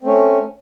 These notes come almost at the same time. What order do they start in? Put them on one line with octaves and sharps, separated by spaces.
C4 A3 C#4